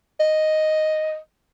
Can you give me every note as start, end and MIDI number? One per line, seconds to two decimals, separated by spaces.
0.20 1.17 75